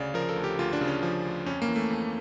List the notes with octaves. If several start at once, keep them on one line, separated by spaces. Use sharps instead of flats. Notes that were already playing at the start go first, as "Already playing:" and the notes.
Already playing: D2 C#3 D5 F5
F3 A#4
A4
D2
G4
D2 F4
D4
C#3
C#4
F3
D2
F2 C#4
A#3
E3
A3
F2